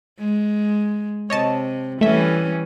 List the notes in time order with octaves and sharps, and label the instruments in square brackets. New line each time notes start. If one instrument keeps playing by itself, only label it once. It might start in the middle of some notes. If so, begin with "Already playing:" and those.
[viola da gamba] G#3
[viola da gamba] C3 [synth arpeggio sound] C#5 D#5 A5
[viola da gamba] E3 G3 C#4 [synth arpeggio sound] A3 E5